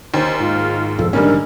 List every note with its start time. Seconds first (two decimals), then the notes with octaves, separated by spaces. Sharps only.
0.14 D#2 C#4 C5
0.40 G#2 F4
0.98 B1 F2 F3 A4
1.13 A#1 A#2 D3 D#3 G3 C#4 A#4